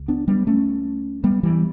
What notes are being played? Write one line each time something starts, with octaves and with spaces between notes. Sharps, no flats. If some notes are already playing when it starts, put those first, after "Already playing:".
Already playing: C#2
B3 D4
G3 B3
A3 C#4
G3 B3
E3 G3